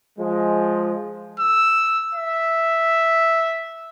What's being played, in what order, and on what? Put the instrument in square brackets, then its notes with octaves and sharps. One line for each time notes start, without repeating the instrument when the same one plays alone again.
[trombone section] F3 G#3
[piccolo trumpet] E6
E5